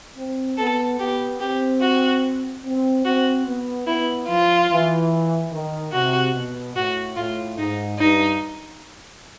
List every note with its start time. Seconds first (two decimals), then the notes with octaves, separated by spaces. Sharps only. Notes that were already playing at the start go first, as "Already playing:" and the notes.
0.17 C4
0.58 B3 A4
0.99 B3 G4
1.41 C4 G4
1.81 F#4
2.65 C4
3.05 C4 F#4
3.47 B3
3.87 B3 E4
4.28 F3 F4
4.70 E3
5.52 D#3
5.93 C3 F#4
6.34 B2
6.75 A2 F#4
7.16 A2 F4
7.58 G#2 D#4
7.99 G2 D#4